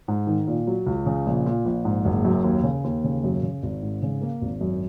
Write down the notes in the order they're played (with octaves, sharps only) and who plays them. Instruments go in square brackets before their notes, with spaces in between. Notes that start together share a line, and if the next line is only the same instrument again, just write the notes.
[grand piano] G#2
D#3
A#2
F#3
C#2
C#3
A#1
A#2
A#1
G#2
F#1
F#2
D#2
C#3
D#2
C#3
F#2
C#3
G#1
G#2
C#3
A#3
G#1
F#2